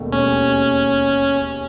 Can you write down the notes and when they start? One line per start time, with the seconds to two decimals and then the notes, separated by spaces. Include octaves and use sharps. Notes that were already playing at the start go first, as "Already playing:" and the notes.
Already playing: E1 D#2 A3
0.12 C#4